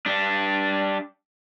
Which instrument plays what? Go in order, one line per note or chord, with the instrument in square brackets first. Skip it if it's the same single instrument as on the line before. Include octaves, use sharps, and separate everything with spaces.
[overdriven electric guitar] G3 D4